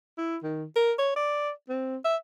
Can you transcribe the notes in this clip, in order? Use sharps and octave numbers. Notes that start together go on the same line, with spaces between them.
E4
D#3
A#4
C#5
D5
C4
E5